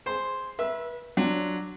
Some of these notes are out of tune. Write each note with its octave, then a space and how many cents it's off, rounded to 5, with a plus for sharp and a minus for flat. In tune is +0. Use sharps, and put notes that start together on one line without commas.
G#4 +0 C5 +0 C6 +0
B4 -30 E5 +0
F#3 +0 D4 +0 F4 +0